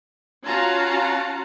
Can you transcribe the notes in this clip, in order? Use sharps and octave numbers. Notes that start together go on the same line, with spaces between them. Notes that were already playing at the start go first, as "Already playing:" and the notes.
C#4 F4 F#4 F5 A5 A#5